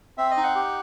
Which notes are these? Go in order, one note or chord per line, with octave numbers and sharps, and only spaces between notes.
C4 E5
D#5
D#4
F#5
G4